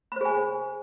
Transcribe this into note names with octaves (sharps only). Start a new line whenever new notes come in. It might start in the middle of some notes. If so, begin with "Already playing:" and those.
G#4 C5 G#5 B5